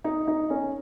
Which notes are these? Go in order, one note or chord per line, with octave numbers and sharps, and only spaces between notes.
D#4
D#4
C#4